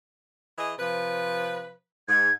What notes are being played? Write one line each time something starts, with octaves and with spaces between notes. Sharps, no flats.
E3 G#4 D#5
C3 F3 B4
G#2 G#6